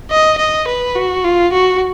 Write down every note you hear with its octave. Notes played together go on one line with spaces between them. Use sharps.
D#5
D#5
B4
F#4
F4
F#4